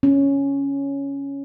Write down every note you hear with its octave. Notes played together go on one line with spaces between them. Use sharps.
C#4